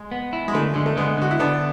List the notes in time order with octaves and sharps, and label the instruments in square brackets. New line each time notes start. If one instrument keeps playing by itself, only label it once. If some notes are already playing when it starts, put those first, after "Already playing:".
Already playing: [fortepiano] G#3
[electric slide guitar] B3
E4
[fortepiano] G#3
[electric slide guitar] D3 [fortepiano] A3
[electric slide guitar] D3 [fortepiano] G#3
[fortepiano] A3
[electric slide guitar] D3 [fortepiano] G#3 B3
[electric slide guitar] D3 [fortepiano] F#4
[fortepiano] E4
[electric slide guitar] D3 [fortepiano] B3 D4